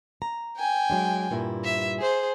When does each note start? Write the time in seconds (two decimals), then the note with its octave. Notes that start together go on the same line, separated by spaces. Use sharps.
0.22 A#5
0.56 G5 G#5
0.90 F#3 G#3 D4
1.31 G2 A#2 E4
1.65 E5
1.99 G#4 C5